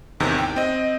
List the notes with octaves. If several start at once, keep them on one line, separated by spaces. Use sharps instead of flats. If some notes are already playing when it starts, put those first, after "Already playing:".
A1 E2 C3 D#3 G6
G5
C4 D#5